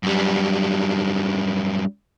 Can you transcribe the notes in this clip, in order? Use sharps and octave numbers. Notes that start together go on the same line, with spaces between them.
F#2 G3